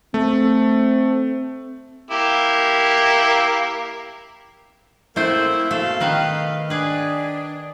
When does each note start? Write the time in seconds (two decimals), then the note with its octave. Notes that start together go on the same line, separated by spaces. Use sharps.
0.14 A3 C4
2.11 A#3 E4 G4
5.16 A3 A#3 C4 E4 C5
5.71 B2 A3 A4 F5
6.00 D#3 B4 D#5
6.70 D4 G#4 B4